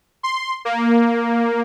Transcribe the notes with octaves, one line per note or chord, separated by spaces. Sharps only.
C6
A#3